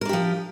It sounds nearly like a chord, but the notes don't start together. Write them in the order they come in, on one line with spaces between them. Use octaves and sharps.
A#4 D4 G4 F3